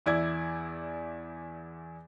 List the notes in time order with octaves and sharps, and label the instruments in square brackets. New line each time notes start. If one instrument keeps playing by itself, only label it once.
[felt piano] E2 E4 D5 G#6